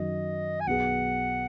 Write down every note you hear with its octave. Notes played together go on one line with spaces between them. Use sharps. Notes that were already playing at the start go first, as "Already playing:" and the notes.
Already playing: F#2 D#3 F#3 D#5
G#5
B1 B2 B3 G#4 F#5